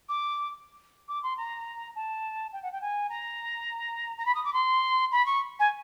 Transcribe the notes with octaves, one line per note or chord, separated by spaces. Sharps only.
D6
D6
C6
A#5
A5
G5
F#5
G5
G#5
A#5
A#5
B5
D#6
D6
C6
B5
C#6
G#5